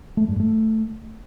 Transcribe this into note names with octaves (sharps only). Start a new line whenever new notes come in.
A3
G2
A3